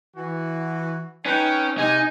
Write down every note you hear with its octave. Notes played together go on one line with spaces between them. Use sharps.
E3 F#4
C#4 D#4 B4 G5
C3 D#4 G#5